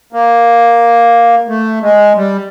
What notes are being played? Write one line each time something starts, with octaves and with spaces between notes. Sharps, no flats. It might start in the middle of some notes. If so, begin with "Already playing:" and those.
A#3
A3
G#3
G3